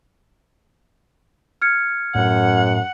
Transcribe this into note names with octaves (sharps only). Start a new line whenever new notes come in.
F6 G#6 C#7
F#2 A2 F#5